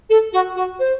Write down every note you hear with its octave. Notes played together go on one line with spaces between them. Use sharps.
A4
F#4
F#4
C5